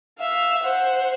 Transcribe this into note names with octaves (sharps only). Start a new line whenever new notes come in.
E5 F5
C5 F#5